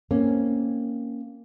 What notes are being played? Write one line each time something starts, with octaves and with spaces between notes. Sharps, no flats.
A#3 C4 C#4